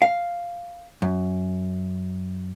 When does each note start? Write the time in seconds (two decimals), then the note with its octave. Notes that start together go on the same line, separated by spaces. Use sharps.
0.02 F5
1.02 F#2